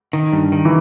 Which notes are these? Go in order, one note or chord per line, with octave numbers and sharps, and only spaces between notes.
D#3
G2
D#3
E3